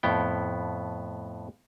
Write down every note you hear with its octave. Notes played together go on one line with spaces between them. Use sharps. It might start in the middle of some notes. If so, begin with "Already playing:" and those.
F2 A2 B3 G5